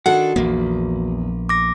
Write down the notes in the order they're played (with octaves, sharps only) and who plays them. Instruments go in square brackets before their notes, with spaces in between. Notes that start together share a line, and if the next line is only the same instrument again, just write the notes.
[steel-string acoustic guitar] D#3 D4 A4 [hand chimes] F#4 [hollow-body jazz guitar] F#5
[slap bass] A#1 A#3 [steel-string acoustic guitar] E2
[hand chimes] D6 A#6